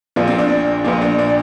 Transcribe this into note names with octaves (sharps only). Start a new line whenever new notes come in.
A#1 A#2 F3 D4
C4
D4
A#1 A#2 F3 D4
D4
D4